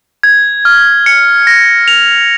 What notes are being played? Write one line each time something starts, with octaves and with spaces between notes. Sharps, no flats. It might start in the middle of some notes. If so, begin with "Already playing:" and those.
G#6
F6
C#7
A#6
F7